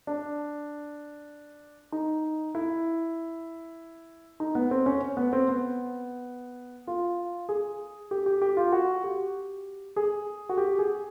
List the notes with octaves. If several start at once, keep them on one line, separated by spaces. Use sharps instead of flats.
D4
D#4
E4
D#4
B3
C4
C#4
B3
C4
B3
F4
G#4
G4
G4
G4
F4
F#4
G4
G#4
F#4
G4
G#4